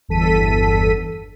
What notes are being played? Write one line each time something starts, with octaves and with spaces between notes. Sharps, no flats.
G1 E2 A4 B6 D#7